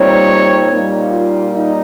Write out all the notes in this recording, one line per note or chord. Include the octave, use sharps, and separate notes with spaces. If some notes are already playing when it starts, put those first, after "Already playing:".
Already playing: A#2 G3 C4 D#4 C#5
A#2 G3 A#3 D#4
F4
D#4